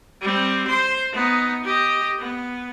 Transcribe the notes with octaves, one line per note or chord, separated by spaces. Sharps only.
G3 C4
C5 C6
B3 D#4
G4 D#5
B3